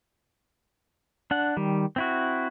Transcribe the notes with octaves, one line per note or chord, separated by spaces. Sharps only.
D4 F#5
D#3 G3
C4 E4 F#4